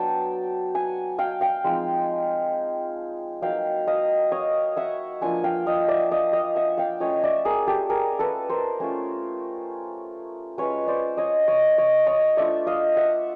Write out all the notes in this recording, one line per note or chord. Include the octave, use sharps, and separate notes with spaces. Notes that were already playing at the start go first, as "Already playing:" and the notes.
Already playing: F#3 B3 D4 G5 A5
F#5 G#5
F5 G5
F5 G5
F3 G#3 C4 D#4
F#3 A#3 D#4 F5 G5
D#5 F5
C#5 D#5
E5 F#5
F3 A#3 D4 F4 F#5 G#5
F5 G5
D#5 F5
D5 E5
D#5 F5
D#5 F5
E5 F#5
F5 G5
A3 C#4 F4 C#5 D#5
D5 E5
G#4 A#4
G4 A4
G#4 A#4
A4 B4
A#4 C5
A3 C#4 F4
G#3 C#4 F4 B4 C#5
C5 D5
C#5 D#5
C#5 D#5
C#5 D#5
C#5 D#5
A3 D4 F4 D5 E5
D#5 F5
E5 F#5